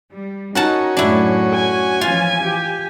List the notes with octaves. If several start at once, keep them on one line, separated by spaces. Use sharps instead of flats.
G3
C#4 D#4 F#4 A#4 F#5 A5
F#2 A2 D4 E4
G#5
E3 F3 C#4 F4
G4